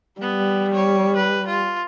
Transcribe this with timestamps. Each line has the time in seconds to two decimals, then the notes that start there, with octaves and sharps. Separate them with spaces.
0.21 G3 B3
0.73 C#5
1.16 B4
1.47 F4